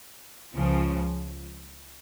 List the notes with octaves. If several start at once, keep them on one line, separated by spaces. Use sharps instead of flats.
C#2 C#3 F3